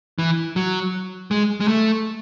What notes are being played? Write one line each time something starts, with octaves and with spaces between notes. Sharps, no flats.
E3
F#3
G#3
G#3
A3